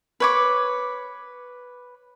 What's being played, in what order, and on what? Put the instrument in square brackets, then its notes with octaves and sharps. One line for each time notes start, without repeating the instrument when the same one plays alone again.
[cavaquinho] B4 C#5 D6